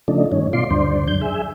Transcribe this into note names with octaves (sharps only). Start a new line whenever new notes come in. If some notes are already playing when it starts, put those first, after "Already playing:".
C#3 F3 A3 D4 D#4
G2 D#3 C#4
B2 F4 D5 C6
D2 G2 D4 C5
F#2 D3 G6
G#4 E5